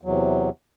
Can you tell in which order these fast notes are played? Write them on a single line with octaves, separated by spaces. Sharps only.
E2 F#3 C3